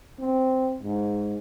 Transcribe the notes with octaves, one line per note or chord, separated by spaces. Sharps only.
C4
G#2